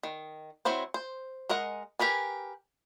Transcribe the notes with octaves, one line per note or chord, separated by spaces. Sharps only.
D#3
F#3 C4 E4 F#4 C5
C5
G#3 A#4 D#5 F#5
G4 A#4 B4 G#5